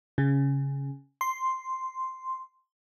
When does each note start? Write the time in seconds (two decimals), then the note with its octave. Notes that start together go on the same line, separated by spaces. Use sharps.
0.18 C#3
1.21 C6